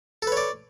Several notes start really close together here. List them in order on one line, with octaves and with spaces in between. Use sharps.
A4 B4 C#5 D5